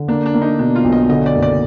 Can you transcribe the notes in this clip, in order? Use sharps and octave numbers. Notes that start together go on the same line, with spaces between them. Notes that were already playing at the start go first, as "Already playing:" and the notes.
Already playing: D3
A#3 D4
D4
A#3
D#4
B2 D4
F4
B1
D#5
D3 D#5
D5
F#1
D5